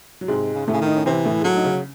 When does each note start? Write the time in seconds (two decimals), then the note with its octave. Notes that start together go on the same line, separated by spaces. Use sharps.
0.21 F#3
0.28 G#2 C3 G#3
0.54 C#3
0.67 A2 C3 A3
0.73 C#3
0.81 D#3
0.87 D#4
0.96 C#4
1.06 C3 E3 C4
1.25 A2 A3
1.40 G#3
1.44 A2 F#3 A3
1.56 D#4
1.64 C#3 C#4